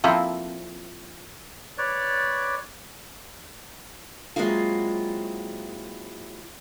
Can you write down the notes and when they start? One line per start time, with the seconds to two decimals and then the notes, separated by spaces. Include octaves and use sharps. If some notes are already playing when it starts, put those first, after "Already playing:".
0.04 F3 A#3 C4 E4 A4
1.78 B4 C#5 D5
4.36 F#3 G#3 A#3 C4 E4 F4